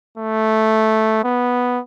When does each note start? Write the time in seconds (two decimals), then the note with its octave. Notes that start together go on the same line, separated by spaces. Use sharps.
0.18 A3
1.24 B3